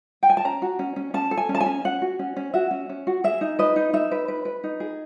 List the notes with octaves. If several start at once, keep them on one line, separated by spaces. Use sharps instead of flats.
G5
G#5
A5
C#4 A#5
F#4
C#4
C#4
C#4 A5
A4
G#5
C#4
A5
G#5
C#4
C#4 F#5
F#4
C#4
C#4
F#4 E5
C#4
C#4
F#4
G#4 E5
D#4
B4 D#5
D#4
D#4 E5
B4
B4
B4
D#4
G#4